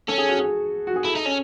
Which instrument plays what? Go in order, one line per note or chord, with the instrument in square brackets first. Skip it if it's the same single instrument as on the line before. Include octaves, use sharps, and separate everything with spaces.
[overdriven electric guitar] C#4 [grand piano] A4
[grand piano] G#4
F#4
G#4
F#4
G#4
[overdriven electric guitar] E4 [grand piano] A4
[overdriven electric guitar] D#4
C#4